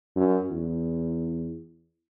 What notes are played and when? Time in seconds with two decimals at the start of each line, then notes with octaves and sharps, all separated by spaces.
0.16 F#2
0.52 E2